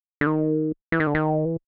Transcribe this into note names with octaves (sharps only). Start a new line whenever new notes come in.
D3
D#3
E3
D#3
D3
D#3
E3